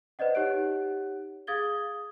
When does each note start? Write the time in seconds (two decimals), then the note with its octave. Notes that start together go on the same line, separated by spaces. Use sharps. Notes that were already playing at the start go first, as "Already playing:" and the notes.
0.19 B4 C5 D5 D#5 F#5
0.35 D#4 G4 C#5 F#5 F#6 D7
1.47 G#4 F5 D#6 G#6 A6 G7